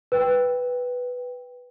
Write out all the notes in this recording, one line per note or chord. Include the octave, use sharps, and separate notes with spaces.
B4 G5